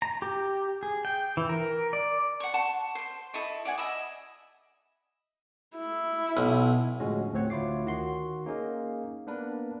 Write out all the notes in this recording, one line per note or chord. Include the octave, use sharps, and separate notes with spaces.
A#5
G4
G#4
G5
E3
A#4
D5
F#5 C#6
F#5 A5 C6 C#6
C5 C6
E4 A4 D#5 C#6
D5 F#5 G#5
D#5 E5 B5 D#6
E4
B1
A2 D3 F3 G#3 C#4 F#4
D2 A2 C4 C5 C#5 F#5
D2 E4 F4 C#5 D6 C7
D#3 F#4 C6
A#3 C#4 D#4 G#4 F5
A#3 B3 D4 A#4 B4